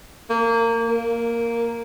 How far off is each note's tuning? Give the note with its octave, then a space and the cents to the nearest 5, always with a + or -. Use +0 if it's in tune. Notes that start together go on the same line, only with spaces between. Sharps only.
A#3 -25
A#3 +0